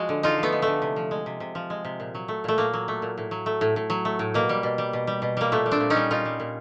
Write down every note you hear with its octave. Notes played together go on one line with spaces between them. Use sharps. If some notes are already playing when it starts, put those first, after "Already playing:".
Already playing: F3 G#3 F#4
D3
D3 D#4 F4
F3
A3 B3
G#3
D3 A3
C3
F3
G#3
C3
C3
F3
G#3
C3
A#2
F#3
A3
A#2 A3
A#2 A#3
F#3
A3
A#2
A2
F#3
A3
A2
A2
F#3
A3
A2
B2 A#3
G3
B2
G3
B2
G3
B2
G3 A#3
A#2 A3
G3
C4 D4
A#2
C#4 D#4
G3
A#2 D#4 F4
G3
A#2